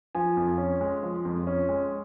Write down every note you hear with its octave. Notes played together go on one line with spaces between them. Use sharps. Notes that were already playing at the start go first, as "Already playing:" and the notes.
F3 G#5
F2
C#4
G#3
F3
F2
C#4
G#3